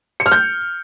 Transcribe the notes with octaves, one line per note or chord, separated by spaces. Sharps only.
C#7
F6
G6